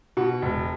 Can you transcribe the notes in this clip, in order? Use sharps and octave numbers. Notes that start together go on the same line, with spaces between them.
B2 F#5
E1